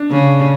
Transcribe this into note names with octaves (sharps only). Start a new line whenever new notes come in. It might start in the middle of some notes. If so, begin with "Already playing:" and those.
Already playing: D4
C#3